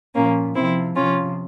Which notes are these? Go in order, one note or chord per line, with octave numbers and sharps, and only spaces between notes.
A#2 F3 A#3 C#4
C3 F3 C4 E4
C3 F3 C#4 F4